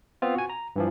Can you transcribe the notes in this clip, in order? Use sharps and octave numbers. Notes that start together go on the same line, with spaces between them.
B3 C4 F4
F#4 G#5
A#5
G2 E3 F3